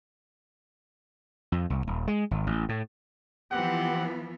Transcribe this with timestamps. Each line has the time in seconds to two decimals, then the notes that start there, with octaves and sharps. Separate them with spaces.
1.52 F2
1.70 C2
1.87 D#1
2.07 G#3
2.31 G#1
2.47 A1
2.69 A2
3.52 E3 F3 B3 C4 G4 F#5